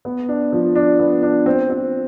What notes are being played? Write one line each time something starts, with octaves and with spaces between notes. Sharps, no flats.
B3
D4
F3
D4
B3
D4
C4
C4